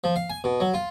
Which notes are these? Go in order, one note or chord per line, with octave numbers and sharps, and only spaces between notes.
F3
F5
G#5
B2
F#3
F4